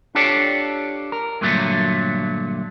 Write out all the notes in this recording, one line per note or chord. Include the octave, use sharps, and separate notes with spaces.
D4 F4 G4 A4 C#5 D5
A#4
G2 A#2 D3 F#3 G3 A3